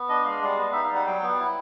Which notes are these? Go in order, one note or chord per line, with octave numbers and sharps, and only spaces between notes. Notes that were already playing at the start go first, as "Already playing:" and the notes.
Already playing: B3
D4 D#5
G#3 F5
G3
B3
D#4 E5
F5
G3 F#5
F#3 G5
B3
F#5
E4